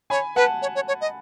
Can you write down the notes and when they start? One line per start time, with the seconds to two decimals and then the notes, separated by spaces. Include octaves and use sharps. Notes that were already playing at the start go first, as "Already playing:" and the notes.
0.10 C#5 G#5 B5
0.36 B4 F#5 A5
0.62 C#5
0.75 C#5
0.88 C#5
1.01 D#5